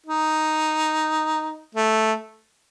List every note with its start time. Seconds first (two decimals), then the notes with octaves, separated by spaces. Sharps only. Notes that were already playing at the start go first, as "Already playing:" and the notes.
0.06 D#4
1.75 A3